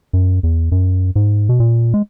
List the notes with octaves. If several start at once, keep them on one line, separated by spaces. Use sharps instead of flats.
F#2
E2
F#2
G#2
B2
A#2
G#3